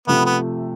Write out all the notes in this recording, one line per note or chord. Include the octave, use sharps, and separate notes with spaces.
C3 F3 A3 B3
B3